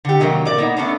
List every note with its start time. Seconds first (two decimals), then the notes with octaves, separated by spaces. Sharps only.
0.05 D3 G4
0.20 C3 D#3 F#3 A#3
0.45 A#2 A#4 D5
0.58 A#3 B3 D#4
0.77 A3 B3 C#4 D4